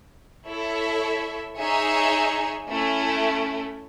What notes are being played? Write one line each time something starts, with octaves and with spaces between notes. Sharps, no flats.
E4 A4 C#5 E5
D#4 G#4 C#5 E5 G#5
A3 C#4 E4